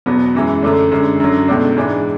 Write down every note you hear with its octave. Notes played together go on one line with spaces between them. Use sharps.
E2 B2 F#3 B3
F#2 E3 G#3
F#2 D3 A3 D4
F#2 D3 G#3
F#2 D3 F#3
C#2 B2 A3 D4
G#2 E3 G#3 D4